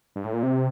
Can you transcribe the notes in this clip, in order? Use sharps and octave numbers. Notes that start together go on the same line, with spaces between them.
G2
A2
A#2
C3